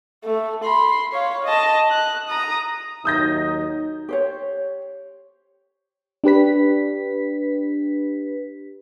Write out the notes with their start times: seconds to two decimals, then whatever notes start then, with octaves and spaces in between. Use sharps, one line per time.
0.24 A3
0.64 B5 C6
1.13 C#5 F5
1.45 D#5 A5
1.91 F#6
2.29 A#5 D#6
3.05 D#2 F#3 D#4 D#6 G6 A#6
4.09 G4 C5 C#5
6.24 D4 G4 B4 B6